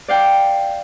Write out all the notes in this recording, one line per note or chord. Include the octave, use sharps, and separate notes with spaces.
D5 F5 G5